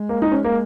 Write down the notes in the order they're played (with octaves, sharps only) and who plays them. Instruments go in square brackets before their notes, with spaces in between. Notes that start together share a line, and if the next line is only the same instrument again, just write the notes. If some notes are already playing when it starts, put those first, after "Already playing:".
Already playing: [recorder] G#3
[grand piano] A#3
D#4
C#4
A#3